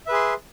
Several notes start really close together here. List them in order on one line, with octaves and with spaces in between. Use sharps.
E5 B4 G#4 C6